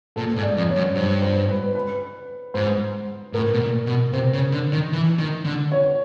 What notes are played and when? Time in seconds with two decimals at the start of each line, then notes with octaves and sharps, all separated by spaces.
0.16 A#2 A4
0.36 G#2
0.43 D5
0.57 F2
0.69 C#5
0.76 F#2
0.95 G2 C5
1.22 C5
1.49 B4
1.75 B4
2.54 G#2 C5
3.33 A2 A#4
3.53 B2
3.60 A#2
3.86 B2
4.13 C3 C5
4.33 C#3
4.52 D3
4.72 D#3
4.93 E3
5.19 D#3
5.45 D3
5.72 C#5